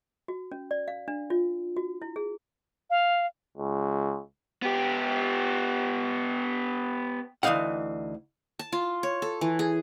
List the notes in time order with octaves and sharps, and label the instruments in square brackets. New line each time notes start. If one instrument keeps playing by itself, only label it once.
[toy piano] F#4
C#4
D5
F5
D4
F4
F#4
E4
G#4
[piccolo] F5
[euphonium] C#2
[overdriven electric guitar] B3 G4
[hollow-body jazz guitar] D2 E3 F3 D#4 F5 F#5
[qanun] A5
F4
C#5
A4
E3
G#4